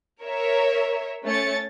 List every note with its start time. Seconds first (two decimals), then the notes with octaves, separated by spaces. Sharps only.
0.23 A#4 C#5 E5
1.24 A3 C#4 C#5 A6 C#7